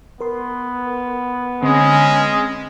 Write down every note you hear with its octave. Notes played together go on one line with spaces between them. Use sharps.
B3 A#4 C6
D3 G#3 C4 C#4 D#6